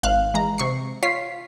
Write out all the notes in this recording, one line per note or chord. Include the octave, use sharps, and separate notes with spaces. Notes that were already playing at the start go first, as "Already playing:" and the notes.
G#1 F5 F#6
E3 G#3 A#5
C3 C#6 C7
F4 C#5 B6 C7